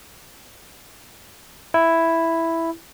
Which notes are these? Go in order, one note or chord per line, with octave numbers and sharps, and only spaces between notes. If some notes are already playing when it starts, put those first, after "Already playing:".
E4